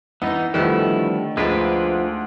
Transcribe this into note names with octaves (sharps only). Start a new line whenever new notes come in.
E3 B3 D#4
D3 D#3 F3 G3 A3 B3 E4
D2 F3 G#3 D4 D#4 B4